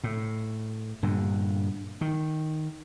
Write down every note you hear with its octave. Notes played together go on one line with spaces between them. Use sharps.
A2
G2 A#2 D3
D#3